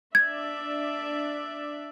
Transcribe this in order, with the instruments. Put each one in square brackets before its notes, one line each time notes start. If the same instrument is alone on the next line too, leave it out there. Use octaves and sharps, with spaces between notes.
[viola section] D4 D5 E5 [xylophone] G#6